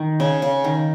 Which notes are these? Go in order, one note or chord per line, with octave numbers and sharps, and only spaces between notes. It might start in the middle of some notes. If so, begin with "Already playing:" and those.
Already playing: D#3
C#3
C#3
D#3